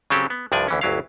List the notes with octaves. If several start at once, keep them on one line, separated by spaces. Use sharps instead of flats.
C#3 F#3 C4 C#4 G4 A4
B3
C2 G2 F3 D4 D5 G#5
D2 E3 C#4
G1 D2 F#3 E4 F5